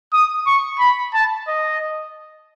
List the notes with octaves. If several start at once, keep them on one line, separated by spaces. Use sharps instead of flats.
D#6
C#6
B5
A5
D#5